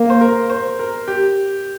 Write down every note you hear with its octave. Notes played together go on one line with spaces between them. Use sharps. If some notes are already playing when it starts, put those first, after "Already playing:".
Already playing: A#3
C5
A#4
C5
A#4
G4